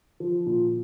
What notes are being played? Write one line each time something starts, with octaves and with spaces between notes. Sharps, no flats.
F3
A#2